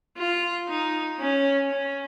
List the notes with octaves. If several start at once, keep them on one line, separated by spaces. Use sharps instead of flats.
F4
D#4
C#4
C#4